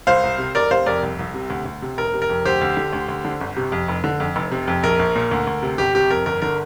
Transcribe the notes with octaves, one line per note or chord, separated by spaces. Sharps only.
C2 C5 F5
C2
C3
F1 A#4 D5
C3 C5 F5
F2 A#4 D5
C2
C2
C3
D2
D2
C3
F1 A#4
C3
A#4
F2
D2 G4 C5
D2
D3
D2
D2
D3
G1
C3
F2
F1
D3
F2
F1
C3
F2
A#1 A#4
A#1
A#2
D2
D2
C3
G1 G4
C3 G4
F2 A#4
G1 A#4
D3 A#4